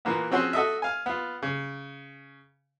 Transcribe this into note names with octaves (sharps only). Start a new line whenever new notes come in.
A#2 E3 A#3 B3
F3 C4 C#4 F#4 G#4 C5
F#4 A4 D#5 E5
F5 G#5
B3 F4
C#3